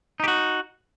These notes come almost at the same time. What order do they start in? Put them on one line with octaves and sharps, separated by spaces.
D#4 G4 F#4